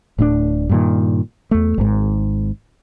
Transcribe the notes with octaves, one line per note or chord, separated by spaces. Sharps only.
D1 A2 C4 D4
G2 A#2 D#3
E2 A3
G#1 G#2